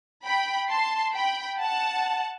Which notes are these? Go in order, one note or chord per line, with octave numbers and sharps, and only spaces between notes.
G5 B5
A5 C6
G5 B5
F#5 A5